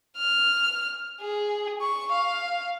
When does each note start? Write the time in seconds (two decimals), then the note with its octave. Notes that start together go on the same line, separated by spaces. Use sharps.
0.17 F6
1.20 G#4
1.81 C#6
2.12 F5